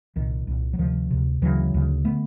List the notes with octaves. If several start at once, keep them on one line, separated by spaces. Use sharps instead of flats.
C2 A#2 D#3
C2 A#2
F#3
D2 C3 D#3 F3
D2 C3
D2 C#3 E3 F#3
D2 C#3
D3 A3 B3